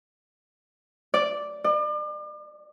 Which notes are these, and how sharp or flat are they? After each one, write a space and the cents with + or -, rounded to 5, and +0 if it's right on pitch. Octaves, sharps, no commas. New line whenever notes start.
D5 -5
D5 +40